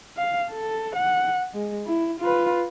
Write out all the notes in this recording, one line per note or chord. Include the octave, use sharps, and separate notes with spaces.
F5
A4
F#5
G#3
E4
F4 B4